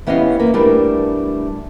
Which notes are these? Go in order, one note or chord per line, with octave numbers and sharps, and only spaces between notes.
E3 B3 C#4 G4 D#5 F5
A#3 B4
E2 G3 A3 D4 A#4 B4